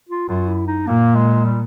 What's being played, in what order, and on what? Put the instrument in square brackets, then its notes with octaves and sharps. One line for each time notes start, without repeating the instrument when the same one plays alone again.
[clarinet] F4
[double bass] F#2 [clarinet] F4
[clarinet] E4
D#4
[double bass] A#2 [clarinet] A#3
[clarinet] G#3
G3